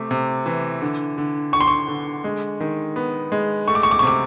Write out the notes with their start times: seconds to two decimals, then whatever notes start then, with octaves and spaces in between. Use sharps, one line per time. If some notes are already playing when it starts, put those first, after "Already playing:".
Already playing: C3 A3 D6
0.11 C3
0.46 E3
0.82 D3
1.18 D3
1.53 D3 C#6
1.61 C6
1.68 C#6
1.88 D3
2.24 G#3
2.60 D#3
2.96 B3
3.32 G#3
3.68 A3 C#6
3.75 D6
3.83 C#6
3.91 D6
3.99 C#6
4.03 C3 D6